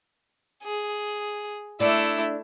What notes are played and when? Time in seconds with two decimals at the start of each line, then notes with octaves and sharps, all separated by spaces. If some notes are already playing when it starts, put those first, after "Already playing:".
0.63 G#4
1.80 A3 D4 E4 D5